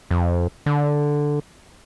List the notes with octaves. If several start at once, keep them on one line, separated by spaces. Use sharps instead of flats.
F2
D3